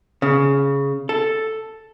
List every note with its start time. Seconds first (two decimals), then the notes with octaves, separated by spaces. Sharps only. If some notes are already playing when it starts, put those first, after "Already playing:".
0.22 C#3
1.09 A4